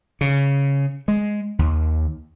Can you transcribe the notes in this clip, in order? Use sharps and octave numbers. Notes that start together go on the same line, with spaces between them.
C#3
G#3
D#2